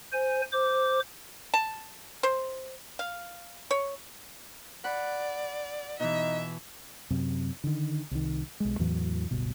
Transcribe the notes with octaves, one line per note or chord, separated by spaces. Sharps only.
C5 G#5
C5 D6
A5
C5
F5
C#5
D5 F#5 B5
B2 E3 D#4 E5
F#2 C3
D3 D#3
C2 D#3
B1 G#3
E2 A2 E3 F#3
D1 G1 B2